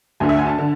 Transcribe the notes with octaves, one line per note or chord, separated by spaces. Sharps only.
D2 D3 A3 G#5
E5
G#5
A5
D3